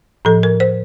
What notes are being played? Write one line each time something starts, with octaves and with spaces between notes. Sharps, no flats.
A2 F3 A4
A#4
C5